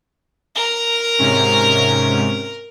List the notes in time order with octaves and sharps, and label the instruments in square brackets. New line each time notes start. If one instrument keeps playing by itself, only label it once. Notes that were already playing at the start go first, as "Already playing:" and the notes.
[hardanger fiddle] A#4 A#5
[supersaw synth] G#2 C3 C#4